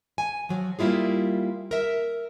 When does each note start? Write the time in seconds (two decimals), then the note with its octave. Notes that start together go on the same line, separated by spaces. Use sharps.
0.18 G#5
0.49 F3 F#3
0.79 G3 A#3 E4 F4 G#4
1.71 A#4 E5